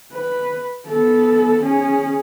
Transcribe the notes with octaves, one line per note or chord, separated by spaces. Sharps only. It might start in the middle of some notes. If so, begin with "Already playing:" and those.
B4
B3 A4
C#4 G#4